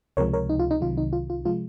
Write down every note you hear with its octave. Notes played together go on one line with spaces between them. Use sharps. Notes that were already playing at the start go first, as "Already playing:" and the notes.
C#2 C3 F3 G#3 A#4 C#5
A#4 C#5
D#4
F4
D#4
C2 C3 D#3 F#3 F4
D#4
F4
F4
C3 F3 G#3 F4